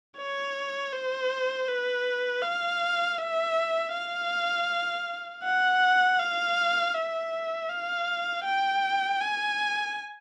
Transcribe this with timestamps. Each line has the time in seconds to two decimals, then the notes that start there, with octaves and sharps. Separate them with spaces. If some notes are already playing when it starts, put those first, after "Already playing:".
0.17 C#5
0.93 C5
1.68 B4
2.43 F5
3.18 E5
3.93 F5
5.44 F#5
6.18 F5
6.94 E5
7.69 F5
8.44 G5
9.21 G#5